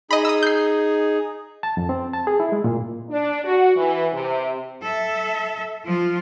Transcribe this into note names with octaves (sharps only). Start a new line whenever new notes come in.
D#4 G#4 D#5 B5
D#6 E6
G6 C7
A5
F2
C4
A5
G#4
E4
G#3
A#2
D4
F#4
E3
C3
A4 E5
F3 F4